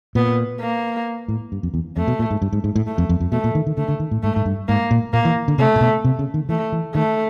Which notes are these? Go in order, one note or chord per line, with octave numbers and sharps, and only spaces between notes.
A#2 B3
A#3
A2
G2
F2
E2
F2 A3
B2
A#2
G#2
G2
G#2
G#2
A2
A3
F2
F2
F2
B2 A3
A#2
D#3
D#3
D3 A3
D3
D#3
A2
G#2 A3
G#2
G2
G#2 A#3
A#2
A#2 A#3
E3
D3
C3 A3
A#2
B2
C3
C#3
D#3
E3 A3
E3
D#3 A3